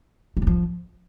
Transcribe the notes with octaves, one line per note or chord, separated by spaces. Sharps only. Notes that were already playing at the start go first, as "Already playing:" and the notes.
A3
F#3
F3